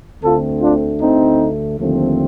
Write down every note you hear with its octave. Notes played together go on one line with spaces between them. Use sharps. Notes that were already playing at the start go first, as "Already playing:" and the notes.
D2 D3 A3 C4 F4 A4
D4 F4
C4 D#4
D#2 D3 F3 A3 C4